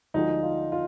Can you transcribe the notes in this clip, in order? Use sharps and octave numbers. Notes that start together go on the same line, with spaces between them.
D2 D3 F3 G#3 D#4
F4
F4